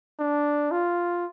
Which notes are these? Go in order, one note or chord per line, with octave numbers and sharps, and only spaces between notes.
D4
F4